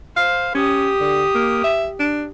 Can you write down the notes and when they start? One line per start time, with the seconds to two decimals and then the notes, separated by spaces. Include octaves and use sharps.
0.16 C5 F5
0.55 C#4 G4 D#6
1.00 D3
1.35 A#3
1.64 E5
1.99 D4